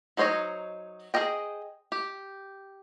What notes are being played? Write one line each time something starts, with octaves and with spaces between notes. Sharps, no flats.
F#3 D#4 C5 C#5 D#5
G#4 A#4 C5 D#5 G5
G4